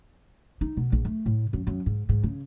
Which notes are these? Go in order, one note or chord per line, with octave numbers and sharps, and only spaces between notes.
D#4
B2
A#1
A3
A2
F#2
F#2
G#2
G#2
C#3